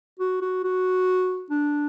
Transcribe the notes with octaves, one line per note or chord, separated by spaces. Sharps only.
F#4
F#4
F#4
D4